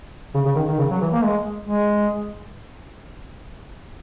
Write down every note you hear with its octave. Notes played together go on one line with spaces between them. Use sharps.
C#3
C#3
D#3
D#3
C#3
F#3
E3
A#3
G#3
G#3